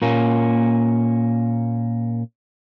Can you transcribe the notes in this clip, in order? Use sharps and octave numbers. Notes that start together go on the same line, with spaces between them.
A#2 A#3 C#4